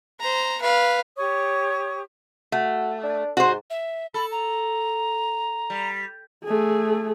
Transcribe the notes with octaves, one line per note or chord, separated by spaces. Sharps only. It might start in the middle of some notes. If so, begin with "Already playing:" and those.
C5 A#5
B4 F5
G4 C#5 C#6 D#6
A3 F#4
D4
G#2 F#4 C5
E5
A4 B5
A#5
G3
A3 G#4